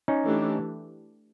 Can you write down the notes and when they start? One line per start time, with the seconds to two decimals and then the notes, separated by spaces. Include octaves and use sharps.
0.08 C#4 D#4
0.24 E3 A3 D4 G4